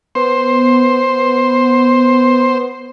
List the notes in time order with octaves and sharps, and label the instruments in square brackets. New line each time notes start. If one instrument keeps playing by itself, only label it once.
[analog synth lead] B3 [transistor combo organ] C5